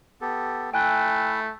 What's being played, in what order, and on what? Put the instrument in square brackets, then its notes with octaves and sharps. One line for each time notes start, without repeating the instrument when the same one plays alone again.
[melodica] B3 G4 A4
[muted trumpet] A3 [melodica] E4 E5 [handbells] G5 G#5 F#6